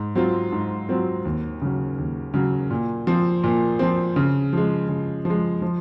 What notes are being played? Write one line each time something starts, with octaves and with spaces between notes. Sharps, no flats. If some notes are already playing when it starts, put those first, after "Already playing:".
Already playing: G#2
F#3 C4 F4
G#2
F#3 C4 F4
D#2
C#3 F#3
D#2
C#3 F#3
A#2
F3 C4
A#2
F3 C4
C#3
F3 G#3
C#3
F3
G#3
F3